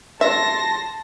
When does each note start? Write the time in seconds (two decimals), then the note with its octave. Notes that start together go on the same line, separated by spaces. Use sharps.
0.21 E5 A5 C6 A#6